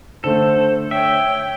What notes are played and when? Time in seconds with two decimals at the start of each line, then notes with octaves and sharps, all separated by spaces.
0.24 D3 A3 A4 C5
0.91 C#5 E5 G5